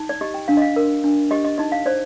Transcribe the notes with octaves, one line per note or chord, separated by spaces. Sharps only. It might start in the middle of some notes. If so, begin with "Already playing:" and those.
Already playing: D#4
D5
G4 D#5
G5
D4 F5
D#5
F5
A#4
D4
G4 D#5
D#5
D#4 D#5
F5
C5 D5